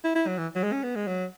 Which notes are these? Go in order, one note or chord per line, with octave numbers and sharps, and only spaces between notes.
E4
E4
F#3
E3
F#3
G#3
C#4
B3
G#3
F#3